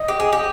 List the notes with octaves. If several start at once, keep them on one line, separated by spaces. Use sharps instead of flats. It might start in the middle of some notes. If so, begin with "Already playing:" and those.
Already playing: D#5
G4
G#4
G4